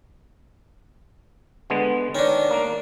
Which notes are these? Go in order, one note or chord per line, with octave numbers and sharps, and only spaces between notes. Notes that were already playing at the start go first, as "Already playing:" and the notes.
D3 G#3 B3
D#3 C#4 D4
A#3